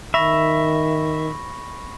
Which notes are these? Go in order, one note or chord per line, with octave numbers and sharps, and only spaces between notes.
D#3 E5 B5 C#6 A#6